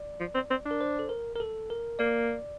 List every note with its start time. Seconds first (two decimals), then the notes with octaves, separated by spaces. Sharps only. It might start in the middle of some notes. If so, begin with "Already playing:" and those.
Already playing: D5
0.20 F3
0.35 C4
0.50 C4
0.66 D4
0.71 A#4
0.81 C5
0.99 A4
1.09 A#4
1.36 A#4
1.40 A4
1.70 A#4
1.99 A#3 D5